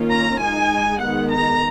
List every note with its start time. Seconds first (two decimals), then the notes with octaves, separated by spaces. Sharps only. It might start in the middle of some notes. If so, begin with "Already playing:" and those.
Already playing: D#3 A#3 C#4 F4
0.09 A#5
0.40 G#3 D#4 G#5
0.99 D#3 G#3 B3 D#4 F#5
1.30 A#5